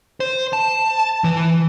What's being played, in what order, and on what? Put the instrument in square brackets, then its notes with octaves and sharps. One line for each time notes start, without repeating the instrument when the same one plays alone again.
[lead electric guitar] C5
A5
E3